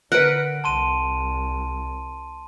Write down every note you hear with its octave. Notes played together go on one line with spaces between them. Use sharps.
D3 A#4 B4 F#5 D7
C2 A5 C6 D#7